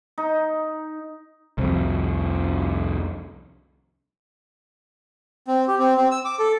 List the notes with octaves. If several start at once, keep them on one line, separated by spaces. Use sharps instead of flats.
D#4
C2 F2
C4
G4
C4
C4
E6
D6
A4